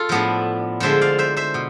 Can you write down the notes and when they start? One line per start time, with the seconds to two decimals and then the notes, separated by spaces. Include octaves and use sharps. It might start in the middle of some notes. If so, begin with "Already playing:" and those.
Already playing: F4 A4
0.09 A2 F3 B3 D4
0.80 D3 F3 G#3 D4 C5 E5
1.01 D5 F5
1.18 C5 E5
1.36 C5 E5
1.54 B2